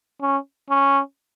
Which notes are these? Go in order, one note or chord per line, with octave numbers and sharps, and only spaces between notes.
C#4
C#4